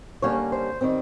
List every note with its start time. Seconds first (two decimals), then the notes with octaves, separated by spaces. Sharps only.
0.22 D3 G3 A#3 C#4 C#5
0.52 C5
0.81 D#3 G3 C4